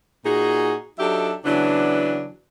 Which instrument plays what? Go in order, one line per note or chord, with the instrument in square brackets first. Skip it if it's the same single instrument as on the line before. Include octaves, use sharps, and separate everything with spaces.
[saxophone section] A#2 D#4 F#4 G#4
F#3 D4 D#4 G4 A4 E5
C#3 E3 F#3 B3 D4